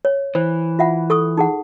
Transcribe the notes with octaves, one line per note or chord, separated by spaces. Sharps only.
C#5
E3 C5
F4 E5 F#5
A4 C#6 D#6
D#4 G#4 F#5